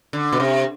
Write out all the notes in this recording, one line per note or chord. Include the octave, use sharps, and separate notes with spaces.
D3
B2
C3